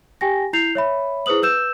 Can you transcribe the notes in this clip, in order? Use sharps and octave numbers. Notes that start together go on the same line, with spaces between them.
G4 G5 G#5 A#6
E4 G6 C7 F7
C#5 E5 B5
E4 G#4 B4 C5 D#6 F#7
B4 E6 G6 E7